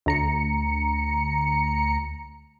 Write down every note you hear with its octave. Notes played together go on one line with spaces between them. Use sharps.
D2 A#5 C#7